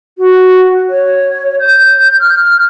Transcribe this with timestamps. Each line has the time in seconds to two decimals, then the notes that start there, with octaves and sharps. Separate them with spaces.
0.18 F#4
0.90 C#5
1.60 G6
2.20 F6